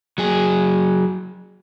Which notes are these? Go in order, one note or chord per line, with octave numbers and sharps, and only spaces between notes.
F#3 G#4